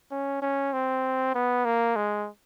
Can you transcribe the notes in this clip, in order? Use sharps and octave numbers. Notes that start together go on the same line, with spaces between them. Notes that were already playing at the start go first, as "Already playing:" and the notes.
C#4
C#4
C4
B3
A#3
G#3